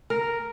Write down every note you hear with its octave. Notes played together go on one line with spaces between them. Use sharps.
A#4